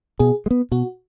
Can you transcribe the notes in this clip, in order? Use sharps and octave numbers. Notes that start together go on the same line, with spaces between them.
B2 G#4
G#3
B3
B2 F#4